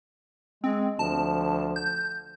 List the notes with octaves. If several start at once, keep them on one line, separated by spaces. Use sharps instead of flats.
G#3 C4
D2 F3 A5
G6